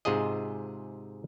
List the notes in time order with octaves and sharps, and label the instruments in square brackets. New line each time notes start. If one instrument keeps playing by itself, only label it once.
[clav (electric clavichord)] G#2 C3 F4 G#4 D#5